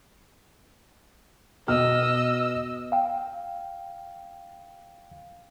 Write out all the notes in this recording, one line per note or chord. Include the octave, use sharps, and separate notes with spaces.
B2 D#5 E6 F6
F5 G5